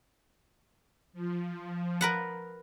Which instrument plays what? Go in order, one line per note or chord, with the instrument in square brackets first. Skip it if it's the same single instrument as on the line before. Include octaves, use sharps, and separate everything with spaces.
[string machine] F3
[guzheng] A#4 B4 F#5